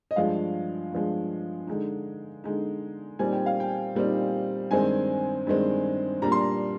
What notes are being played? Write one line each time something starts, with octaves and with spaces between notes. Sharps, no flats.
D#5
G2 F3 G#3 F5
G2 F3 G#3
D3 G#3 D#4
D3 G#3 D#4
A#2 G3 C4 D#4 G#5
G5
F5
G5
A#2 G3 C4 D#4
G2 D#3 G#3 C4 G#5
G2 D#3 G#3 C4
A#2 G3 D4 A#5
C6
A#5